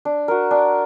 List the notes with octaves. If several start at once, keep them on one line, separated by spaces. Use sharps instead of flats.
D4
F#4 A#4
D4